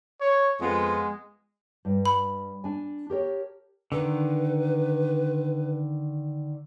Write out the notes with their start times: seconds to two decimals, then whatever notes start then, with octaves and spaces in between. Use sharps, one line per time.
0.21 C#5
0.61 F2 G#3 B3 F4
1.85 G2
2.06 B5
2.64 D4 G#5
3.10 G4 A#4 C#5
3.92 D3 D#3 B4